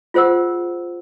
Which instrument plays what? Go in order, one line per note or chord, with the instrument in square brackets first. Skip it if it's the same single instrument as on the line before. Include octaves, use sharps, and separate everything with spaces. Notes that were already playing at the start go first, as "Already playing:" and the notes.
[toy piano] F4 G#4 C5 F#5 E6